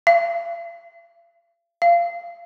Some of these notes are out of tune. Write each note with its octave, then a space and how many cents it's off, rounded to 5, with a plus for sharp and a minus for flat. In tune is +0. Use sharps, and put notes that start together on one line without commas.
F5 -45
F5 -20